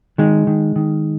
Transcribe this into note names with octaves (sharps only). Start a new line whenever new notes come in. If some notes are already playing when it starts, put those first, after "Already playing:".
D#3 G#3
D#3
D#3